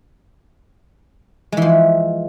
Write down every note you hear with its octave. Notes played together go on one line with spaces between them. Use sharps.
E3 F3 G#3